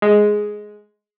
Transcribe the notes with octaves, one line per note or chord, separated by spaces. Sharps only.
G#3